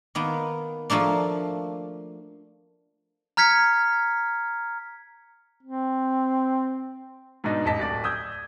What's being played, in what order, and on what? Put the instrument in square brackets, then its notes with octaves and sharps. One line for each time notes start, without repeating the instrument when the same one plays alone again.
[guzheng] D#3 A#3 B3
F3 A3 A#3 D4
[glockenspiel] A#5 F6 G#6 B6 C#7
[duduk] C4
[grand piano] G#2 B2 D4 D#4
A1 D#5 A5 B6
D1 D5
D#6 E6 G6 G#6